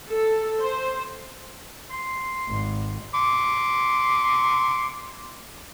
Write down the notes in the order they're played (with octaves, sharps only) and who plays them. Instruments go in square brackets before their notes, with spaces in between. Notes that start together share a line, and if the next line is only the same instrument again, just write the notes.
[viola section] A4
C5
[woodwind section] C6
[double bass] G#1
[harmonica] C6 D6